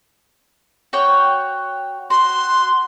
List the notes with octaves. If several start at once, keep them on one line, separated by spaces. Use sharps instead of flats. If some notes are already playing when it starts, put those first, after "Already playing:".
F#4 C#5 G5
F#4 C6